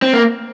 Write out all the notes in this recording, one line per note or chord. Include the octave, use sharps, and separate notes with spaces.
C4
A#3